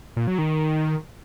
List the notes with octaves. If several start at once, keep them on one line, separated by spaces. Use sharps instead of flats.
A#2
F#3
D#3